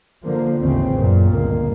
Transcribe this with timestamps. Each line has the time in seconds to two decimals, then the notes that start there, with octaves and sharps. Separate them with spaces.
0.23 D3 F3 A#3
0.60 A1 D#2 A2 C#3 C4
0.94 F#2 A#2
1.29 G1 C#2 A#3